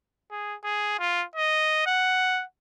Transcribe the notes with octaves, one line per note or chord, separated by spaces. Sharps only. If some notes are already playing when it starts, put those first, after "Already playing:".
G#4
G#4
F4
D#5
F#5